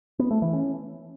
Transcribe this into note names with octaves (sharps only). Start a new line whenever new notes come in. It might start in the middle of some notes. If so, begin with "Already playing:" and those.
B3
A3
E3
C#4